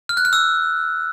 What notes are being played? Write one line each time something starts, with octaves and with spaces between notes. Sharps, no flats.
F6
F#6
F6
E6